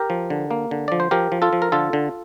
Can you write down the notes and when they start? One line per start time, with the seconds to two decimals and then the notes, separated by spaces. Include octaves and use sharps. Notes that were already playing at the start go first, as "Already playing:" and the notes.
Already playing: G4 A#4
0.10 F3
0.30 D3
0.51 A#3
0.71 D3
0.88 F3 D5
1.00 C5
1.11 F3 G4 A#4
1.32 F3
1.42 F4 A4
1.53 F3
1.62 A#4
1.72 D3 F4 A4
1.93 D3